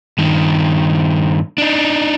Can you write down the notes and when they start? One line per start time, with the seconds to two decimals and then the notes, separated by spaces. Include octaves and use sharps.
0.18 G2 D#3
1.58 D4 D#4